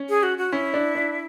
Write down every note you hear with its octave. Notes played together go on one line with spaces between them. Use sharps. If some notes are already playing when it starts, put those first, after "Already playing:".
Already playing: C#4
G#4
F#4
F#4
C#4 E4
D4
D4